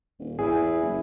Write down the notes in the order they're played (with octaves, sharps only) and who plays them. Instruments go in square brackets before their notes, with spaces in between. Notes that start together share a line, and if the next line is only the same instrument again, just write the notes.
[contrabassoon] D#1
[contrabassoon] E2 [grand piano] E4 G#4
[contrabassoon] F#1